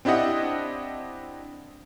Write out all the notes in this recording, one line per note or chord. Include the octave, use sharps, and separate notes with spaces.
C4 D4 E4 G4 D#5 F#5